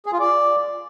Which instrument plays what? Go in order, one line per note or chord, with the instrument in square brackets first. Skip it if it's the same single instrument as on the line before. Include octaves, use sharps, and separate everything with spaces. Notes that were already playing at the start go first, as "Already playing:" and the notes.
[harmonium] G#4
F4
D5